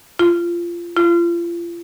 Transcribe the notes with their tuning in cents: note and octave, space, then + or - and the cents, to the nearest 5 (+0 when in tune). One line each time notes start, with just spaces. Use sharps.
F4 -20
F4 -35